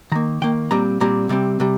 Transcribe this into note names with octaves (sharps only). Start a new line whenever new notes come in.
D#3 A#3 A#5
D#3 A#3 G5
A#2 G3 C4 A#5
A#2 G3 C4 A#5
C3 G3 C4
C3 G3